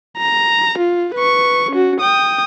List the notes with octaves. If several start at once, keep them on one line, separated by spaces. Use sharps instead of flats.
A#5
F4
B4 C#6
C#4 F#4
G5 D#6